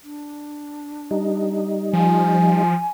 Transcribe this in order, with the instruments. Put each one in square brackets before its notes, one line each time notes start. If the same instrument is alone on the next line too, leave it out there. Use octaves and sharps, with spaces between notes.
[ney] D4
[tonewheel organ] G3 D#4
[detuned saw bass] F3 [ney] G#5